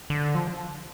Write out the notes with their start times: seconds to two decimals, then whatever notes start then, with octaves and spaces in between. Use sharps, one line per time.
0.10 D3
0.35 F3